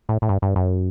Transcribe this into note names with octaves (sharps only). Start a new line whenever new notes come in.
A2
A2
G2
G2
F#2